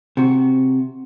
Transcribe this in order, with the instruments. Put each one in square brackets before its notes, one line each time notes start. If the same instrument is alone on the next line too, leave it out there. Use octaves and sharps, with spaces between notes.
[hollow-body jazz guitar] C3 F#4